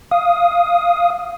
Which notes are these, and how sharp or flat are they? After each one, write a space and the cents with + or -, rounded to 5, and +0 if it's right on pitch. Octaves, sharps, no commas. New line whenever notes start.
F5 +0 D#6 +5